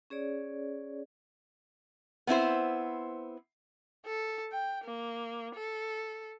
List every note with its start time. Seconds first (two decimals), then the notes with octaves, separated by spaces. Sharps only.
0.10 C#4 G#4 C#5 D5
2.27 B3 C4 E4 C5
4.06 A4
4.52 G5
4.85 A#3
5.55 A4